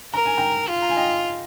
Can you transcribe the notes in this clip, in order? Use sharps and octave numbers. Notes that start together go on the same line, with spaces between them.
A#4 A#5
G#5
G5 A#5
F4
A#5
G#5
D#5 G5